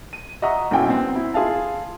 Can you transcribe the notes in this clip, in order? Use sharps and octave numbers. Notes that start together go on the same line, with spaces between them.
D#7
D#5 E5 F#5 A#5 C#6 D#6
B1 F#2 E4 F#4 G5 G#5
B3 C4
E4
F4 G#4 E5 F5 A5